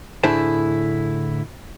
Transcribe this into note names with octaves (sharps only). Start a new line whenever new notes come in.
A2 D3 E4 G#4 C5 A5